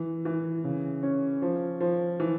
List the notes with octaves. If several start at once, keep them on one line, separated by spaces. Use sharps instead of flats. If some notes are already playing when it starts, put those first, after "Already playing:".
Already playing: E3
E3
C#3
C#4
F3
F3
E3